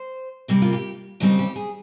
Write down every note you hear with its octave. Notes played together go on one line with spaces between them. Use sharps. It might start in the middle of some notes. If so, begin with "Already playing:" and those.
Already playing: C5
C3 G3 A#3 A#4
F4
G4
D#2 C#3 G3 C4 D#4
G4
G#4